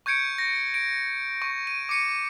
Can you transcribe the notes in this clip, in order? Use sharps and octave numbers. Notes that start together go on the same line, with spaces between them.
C#6 G6 G#6 C#7 D7
A#6
D7
C#6
D#7
D6 C#7 D#7